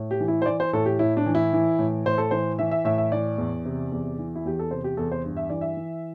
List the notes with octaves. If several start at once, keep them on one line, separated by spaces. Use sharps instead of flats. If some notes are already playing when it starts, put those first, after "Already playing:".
Already playing: A2
G4
E3
E4
C5
E3 D5
C5
A2 A4
G4
A2 E4
D4
E3
E4
E3
A2
A2 C5
A4
E3 C5
E3 E5
E5
A2 E5
E5
E3 D5
E2
C3
E2
E3
E4
E2 G4
A4
C3 C5
G4
E2 A4
C5
G2
E5
E3 D5
E5
E3